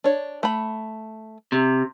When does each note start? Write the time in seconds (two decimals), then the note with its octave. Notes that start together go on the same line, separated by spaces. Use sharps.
0.04 D4 C#5
0.43 A3 B5
1.52 C3